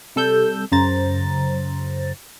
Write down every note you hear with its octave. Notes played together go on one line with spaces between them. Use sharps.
C3 G3 A4 E6 G6
F#2 C#3 C5 A#5 A6